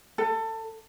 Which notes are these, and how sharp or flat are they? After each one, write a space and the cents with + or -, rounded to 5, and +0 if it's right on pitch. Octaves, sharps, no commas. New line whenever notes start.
A4 +25